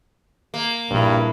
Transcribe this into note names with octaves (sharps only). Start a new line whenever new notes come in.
A#3
A#1 G2 E4